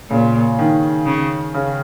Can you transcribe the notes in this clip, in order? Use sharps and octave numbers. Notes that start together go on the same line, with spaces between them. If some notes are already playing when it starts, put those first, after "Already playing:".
A#2 C#3
D#3
C#3
C#3